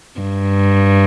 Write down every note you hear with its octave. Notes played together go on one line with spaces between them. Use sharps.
G2